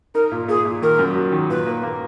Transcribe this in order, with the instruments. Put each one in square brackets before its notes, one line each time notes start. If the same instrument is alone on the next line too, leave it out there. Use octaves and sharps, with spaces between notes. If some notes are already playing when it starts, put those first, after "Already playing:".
[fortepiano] D#4 [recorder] A#4
[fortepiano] A#2
[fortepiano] A#2 [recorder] G#4
[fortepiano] A#2
[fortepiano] D#3 [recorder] A#4
[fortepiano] F#2
F#3
D#3
[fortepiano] A#2 [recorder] B4
[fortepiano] A#3
A#3